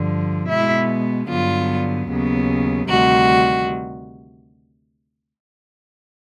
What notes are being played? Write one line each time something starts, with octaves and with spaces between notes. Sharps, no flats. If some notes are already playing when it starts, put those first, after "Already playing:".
Already playing: G2 D3 F3
B2 G#3 B3 E4
G2 D3 F#3 B3 F4
D#2 C#3 F#3 B3
D2 C3 D#3 G3 F#4